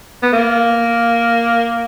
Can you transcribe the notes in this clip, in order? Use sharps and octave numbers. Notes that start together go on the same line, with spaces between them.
B3
A#3